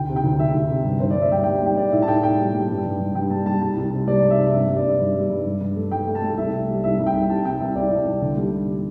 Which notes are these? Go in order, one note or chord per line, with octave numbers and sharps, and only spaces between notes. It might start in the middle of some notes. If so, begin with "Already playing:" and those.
Already playing: D2 G5
C3
G5
D2
D2 E5
D2
C3
G2
G2 C5
G2 D5
E5
G3 G5
G3 G5
G3 G5
G3 D5
A2 E5
A5
A2 G5
A2 G5
G3
G3
G2
G2
G2
G2 G5
G3 A5
G3 A5
C2 A5
C2
C3
G3 D5
G3
E5
C3
G2 E5
G3
D5
G2
G2
G3
G2
G2
G2
A3
G2 G5
A3
A5
A3
C2 E5
C2
G3
C2 E5
C2
G5
C2
C3 A5
C2 G5
C2 E5
C2 D5
C2
C2
D3
G3
G3